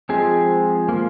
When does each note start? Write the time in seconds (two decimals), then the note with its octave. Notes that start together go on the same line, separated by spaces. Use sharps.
0.09 F3 G#3 C4 G#4
0.89 F3 A#3